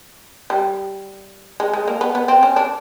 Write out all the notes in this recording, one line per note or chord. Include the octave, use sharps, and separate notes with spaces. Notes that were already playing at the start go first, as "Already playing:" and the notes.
G3
G#3
G#3
A#3
B3
B3
C4
C#4
D4